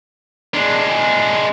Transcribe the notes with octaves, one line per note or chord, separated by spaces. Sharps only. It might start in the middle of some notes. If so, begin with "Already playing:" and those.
G#3 D4